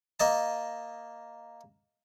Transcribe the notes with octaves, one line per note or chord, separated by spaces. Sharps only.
A#3 D#5 A5